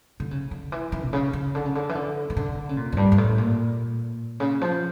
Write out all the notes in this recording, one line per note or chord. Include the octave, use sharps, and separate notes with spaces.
D3
C#3
D3
E3
E3
A#2
C#3
C#3
D3
C#3
D3
E3
D3
E3
D3
C#3
A#2
F2
G2
G2
A2
A#2
C#3
F3